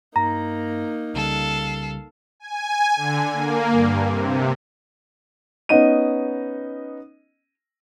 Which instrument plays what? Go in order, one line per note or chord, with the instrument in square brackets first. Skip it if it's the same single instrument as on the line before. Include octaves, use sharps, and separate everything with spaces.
[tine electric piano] G2 A#6 [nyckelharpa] A#3 D#4 [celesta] A#5
[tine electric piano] C2 C#3 G3 [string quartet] A4 F5
[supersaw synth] G#5
D3
A#3
G2
C3
[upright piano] B3 C#4 D#4 D#5 D#7